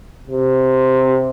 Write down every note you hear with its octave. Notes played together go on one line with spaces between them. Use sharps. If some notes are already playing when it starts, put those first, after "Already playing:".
C3